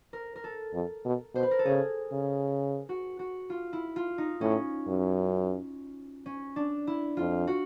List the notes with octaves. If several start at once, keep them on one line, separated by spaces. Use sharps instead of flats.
A#4
A#4
A4
F2
B2
B2 C5
B4
A#4
A4
C#3 G#4
C#3
F#4
F#4
F4
E4
F4
D#4
A2 C#4
F#2
C#4
D4
E4
F2 F4
F#4